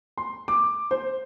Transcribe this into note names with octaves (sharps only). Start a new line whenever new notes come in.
C6
D6
C5